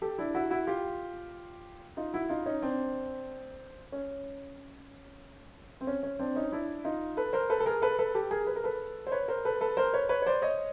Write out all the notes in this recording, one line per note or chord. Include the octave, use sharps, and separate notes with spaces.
G4 A4
D4 E4
E4 F#4
E4 F#4
F4 G4
D#4 F4
E4 F#4
D#4 F4
C#4 D#4
C4 D4
C#4
C4
C#4
C#4
C4 D4
C#4 D#4
D4 E4
D#4 F4
A4 B4
A#4 C5
A4 B4
A4
G#4 A#4
A4 B4
A4 B4
G4 A4
G#4 A#4
B4
A#4
A4 B4
C5
B4 C#5
A#4 C5
A4 B4
A4 B4
A#4 C5
B4 C#5
B4 C#5
C#5
C5 D5
C#5 D#5